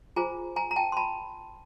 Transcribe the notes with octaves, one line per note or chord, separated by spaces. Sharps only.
F4 G#4 C5 G#5 A#5
G#5 A#5
A#5
G5 A5
C6
A5 B5